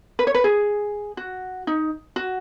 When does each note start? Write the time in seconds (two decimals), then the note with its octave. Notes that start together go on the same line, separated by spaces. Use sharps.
0.19 B4
0.27 C#5
0.34 B4
0.44 G#4
1.17 F#4
1.67 D#4
2.16 F#4